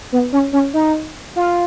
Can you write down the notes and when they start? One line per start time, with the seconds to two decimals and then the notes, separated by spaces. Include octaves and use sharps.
0.12 B3
0.33 C#4
0.53 C#4
0.74 D#4
1.36 F4